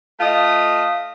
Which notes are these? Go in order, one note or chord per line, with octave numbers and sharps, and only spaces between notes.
A3 F4 D#5